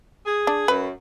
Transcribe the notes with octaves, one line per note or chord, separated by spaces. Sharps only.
G#4
D4
F#2 B4